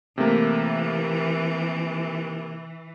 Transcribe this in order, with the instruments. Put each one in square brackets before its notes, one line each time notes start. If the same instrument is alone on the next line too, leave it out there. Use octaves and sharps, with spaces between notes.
[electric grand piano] C3 A3 A#3 [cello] E3